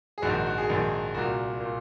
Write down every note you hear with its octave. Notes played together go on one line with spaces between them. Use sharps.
G#4
A#1 G#2 D#3 F#4
F#4
F#4
G#4
A#1 G#2 D#3
C2 A#2 F#4
A#2